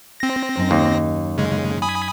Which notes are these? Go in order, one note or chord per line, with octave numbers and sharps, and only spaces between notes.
C4 A#6
F#2 D#4
D#2
C#3 G#3
G#5 B5 D#6